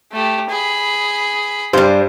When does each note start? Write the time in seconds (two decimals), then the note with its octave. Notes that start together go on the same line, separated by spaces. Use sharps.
0.12 A3 G4
0.49 G#4 B5
1.73 G2 G3 C5